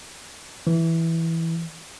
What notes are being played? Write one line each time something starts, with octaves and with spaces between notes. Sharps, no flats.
E3